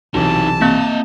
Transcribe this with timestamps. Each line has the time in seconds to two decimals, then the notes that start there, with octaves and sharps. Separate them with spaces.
0.14 B1 C3 E3 D#4 F#4 A5
0.61 A#3 C4 E4 D#5